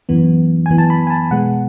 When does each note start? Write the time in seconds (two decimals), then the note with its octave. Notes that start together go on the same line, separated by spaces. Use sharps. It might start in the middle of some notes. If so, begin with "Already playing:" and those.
0.09 F#2 E3 B3
0.66 F#2 E3 B3 G#5
0.78 A5
0.90 B5
1.07 G#5
1.10 A5
1.31 B2 G#3 B3 F#5